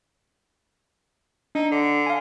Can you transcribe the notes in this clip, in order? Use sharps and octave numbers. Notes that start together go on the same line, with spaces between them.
D4 D#4
D3
F5 G#5